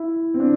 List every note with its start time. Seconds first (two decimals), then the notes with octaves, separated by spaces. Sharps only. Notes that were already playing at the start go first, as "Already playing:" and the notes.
Already playing: E4
0.34 C4
0.40 D4